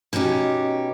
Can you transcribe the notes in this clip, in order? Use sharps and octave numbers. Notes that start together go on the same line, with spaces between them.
B2 C#4 D#4 G4